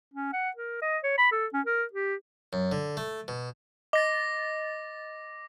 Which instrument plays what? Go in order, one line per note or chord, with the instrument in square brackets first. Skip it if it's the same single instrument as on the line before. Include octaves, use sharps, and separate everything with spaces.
[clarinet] C#4
F#5
A#4
D#5
C#5
B5
A4
C#4
A#4
G4
[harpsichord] F#2
D3
A3
B2
[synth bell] D#5 A6 [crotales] D6 A#6